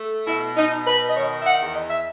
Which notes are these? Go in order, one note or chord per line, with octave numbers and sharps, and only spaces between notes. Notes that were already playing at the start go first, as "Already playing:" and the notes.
Already playing: A3
B2 E4
D#4
D#4
B4
D#5
D#3 C#5
E5
F#5
E2
D#5
E5